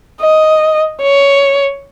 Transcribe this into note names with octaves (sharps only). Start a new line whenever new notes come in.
D#5
C#5